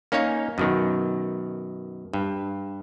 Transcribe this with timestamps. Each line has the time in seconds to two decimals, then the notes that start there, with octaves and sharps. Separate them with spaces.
0.12 A#3 C#4 D#4 C#5 F5
0.58 F#2 B2 D#3
2.13 G2